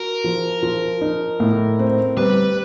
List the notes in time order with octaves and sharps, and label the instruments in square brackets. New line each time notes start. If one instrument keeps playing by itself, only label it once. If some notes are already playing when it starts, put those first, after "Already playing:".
Already playing: [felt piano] F#4 [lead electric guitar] A#4
[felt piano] F3
F3
D#4
A2
C4
[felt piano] G3 [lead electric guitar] B4